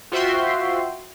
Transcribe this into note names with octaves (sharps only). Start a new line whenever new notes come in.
F4 F#4 C5 E5 G5 C6